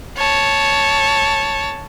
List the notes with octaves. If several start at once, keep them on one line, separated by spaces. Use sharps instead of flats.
C#5 A5